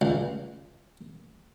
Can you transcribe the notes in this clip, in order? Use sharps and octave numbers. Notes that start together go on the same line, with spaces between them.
C#2